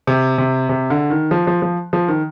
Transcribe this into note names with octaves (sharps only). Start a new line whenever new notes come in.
C3
C3
C3
D3
D#3
F3
F3
F3
F3
D#3